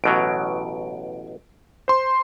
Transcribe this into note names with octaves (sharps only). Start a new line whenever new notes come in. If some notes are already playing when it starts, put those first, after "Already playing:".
A1 B2 F#3 D7
C5 C6